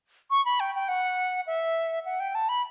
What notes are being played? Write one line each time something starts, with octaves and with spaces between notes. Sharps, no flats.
C#6
B5
G5
G5
F#5
E5
F#5
G5
A5
B5